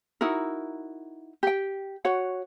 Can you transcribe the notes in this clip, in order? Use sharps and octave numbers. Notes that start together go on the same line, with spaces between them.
D#4 E4 F#4 A#4
G4 G5
F#4 C#5 F#5